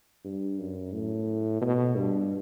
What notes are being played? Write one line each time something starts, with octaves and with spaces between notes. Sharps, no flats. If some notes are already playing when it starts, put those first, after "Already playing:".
G2
F#2
A2
B2
G2